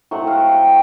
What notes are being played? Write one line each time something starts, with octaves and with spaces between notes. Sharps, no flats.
A2 F#3 A3 C4 F#5
F5 F#5
G5